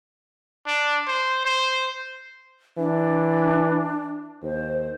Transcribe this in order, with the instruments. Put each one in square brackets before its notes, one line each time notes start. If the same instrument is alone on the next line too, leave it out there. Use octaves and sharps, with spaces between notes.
[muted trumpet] D4
C5
C5
[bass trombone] E3 [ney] D4
[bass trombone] D#2 [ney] C5